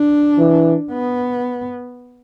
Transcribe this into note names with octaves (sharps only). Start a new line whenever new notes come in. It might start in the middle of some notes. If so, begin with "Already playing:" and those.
Already playing: D4
E3
B3